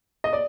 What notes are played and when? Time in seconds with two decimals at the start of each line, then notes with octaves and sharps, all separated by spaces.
0.24 D#5
0.33 D5